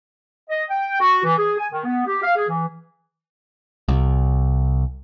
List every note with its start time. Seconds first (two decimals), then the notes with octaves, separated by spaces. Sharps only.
0.50 D#5
0.70 G5
1.01 F#4
1.24 E3
1.38 G#4
1.58 G#5
1.72 D#3
1.85 B3
2.06 G4
2.23 F5
2.36 G#4
2.49 E3
3.88 C2